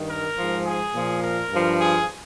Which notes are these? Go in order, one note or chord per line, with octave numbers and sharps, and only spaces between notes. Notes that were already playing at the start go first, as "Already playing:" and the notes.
Already playing: G2 D#3
A#4
G#2 F3
G#4
A#2 F3
A#4
G2 F3
G#4